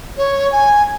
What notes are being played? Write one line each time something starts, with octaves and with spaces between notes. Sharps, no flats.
C#5
G#5